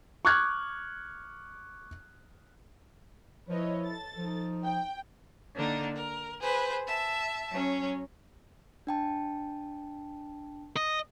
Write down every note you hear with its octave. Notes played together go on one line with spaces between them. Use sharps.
C#6 D6 F6 F#6 G#6
F3 E4 B4 C#5 D#5
A4 A6
F3 D#4
G5
D3 A#3 D4 D#4
A#4
G#4 B4 C5
E5 A5
F#3 C#4
D4 G5 A5
D#5